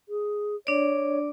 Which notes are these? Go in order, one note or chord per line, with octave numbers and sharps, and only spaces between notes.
G#4
D4 C#5 D5